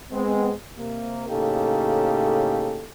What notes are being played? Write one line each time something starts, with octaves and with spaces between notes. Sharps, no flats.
G#3 B3 C4
C3 A#3
A2 C#3 A#3 D#4 G4 A4